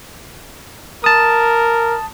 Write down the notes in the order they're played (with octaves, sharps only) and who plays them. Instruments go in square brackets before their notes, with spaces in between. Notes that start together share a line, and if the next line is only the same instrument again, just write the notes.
[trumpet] A#4 [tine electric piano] A5 D#6